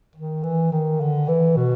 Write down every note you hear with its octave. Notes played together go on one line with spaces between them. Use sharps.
D#3
E3
D#3
D3
E3
B2